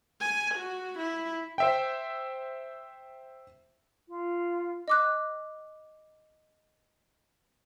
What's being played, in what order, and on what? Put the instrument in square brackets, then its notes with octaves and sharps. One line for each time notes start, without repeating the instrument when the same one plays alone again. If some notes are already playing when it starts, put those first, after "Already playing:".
[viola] G#5
F#4
E4
[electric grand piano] C5 E5 G5
[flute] F4
[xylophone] D#5 D6 F#6